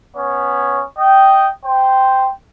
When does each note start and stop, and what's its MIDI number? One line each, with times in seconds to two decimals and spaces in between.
0.16 0.82 59
0.16 0.82 61
0.16 0.82 73
0.99 1.49 75
0.99 1.49 79
1.66 2.30 72
1.66 2.30 79